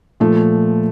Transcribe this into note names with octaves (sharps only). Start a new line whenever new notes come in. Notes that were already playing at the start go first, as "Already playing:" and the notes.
A#2 F3 A3